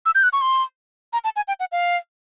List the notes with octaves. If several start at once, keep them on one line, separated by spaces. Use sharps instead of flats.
E6
G6
F#6
C#6
C6
A#5
A5
G#5
G5
F#5
F5